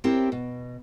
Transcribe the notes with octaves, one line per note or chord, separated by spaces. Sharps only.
C4 E4 G4 A#4 C5 C#5
B2